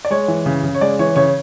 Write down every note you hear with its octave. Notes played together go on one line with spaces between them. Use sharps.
D5
G#3 C#5
E3
C#3
C#3
C#5
G#3 D5
E3 C#5
C#3 C#5